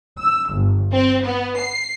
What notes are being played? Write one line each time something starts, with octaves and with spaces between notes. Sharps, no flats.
E6
G1
C4
B3
C7